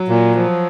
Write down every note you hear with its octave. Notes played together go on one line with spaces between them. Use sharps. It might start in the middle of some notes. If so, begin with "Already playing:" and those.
Already playing: F#3
A#2
F3